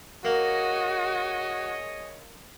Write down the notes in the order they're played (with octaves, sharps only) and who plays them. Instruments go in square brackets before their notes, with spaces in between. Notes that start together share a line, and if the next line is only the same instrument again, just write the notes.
[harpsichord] A#3 [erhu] F#4 [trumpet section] G#4 C#5 D#5